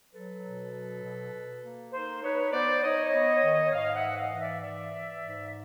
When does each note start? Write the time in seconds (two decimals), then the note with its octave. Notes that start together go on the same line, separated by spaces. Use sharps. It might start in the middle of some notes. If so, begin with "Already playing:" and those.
0.12 F#3 A4 B4
0.42 B2
0.73 F#3
1.02 B2
1.32 B2
1.63 A#3
1.92 D#4 A#4 C5
2.22 D#4 B4 C#5
2.52 B3 C5 D5
2.82 D#4 C#5 D#5
3.12 B3
3.43 D#3
3.72 G#2 D#5 F5
3.94 E5 F#5
4.02 E3
4.17 D#5 F5
4.32 G#2
4.40 D5 E5
4.62 E3 D5 E5
4.93 E3
5.22 G#2